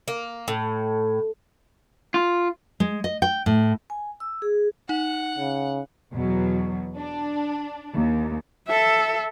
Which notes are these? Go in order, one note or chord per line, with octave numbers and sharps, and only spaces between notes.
A#3
A2
F4
G#3
D#5
G5
A2
G#5
E6
G#4
D#4 F#5
C#3
E2 B2 F#3
D4
D#2
A4 E5